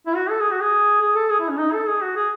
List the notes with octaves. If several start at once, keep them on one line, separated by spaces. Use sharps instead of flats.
E4
F#4
A4
G#4
F#4
G#4
G#4
A4
G#4
E4
C#4
D#4
A4
G#4
F#4
G#4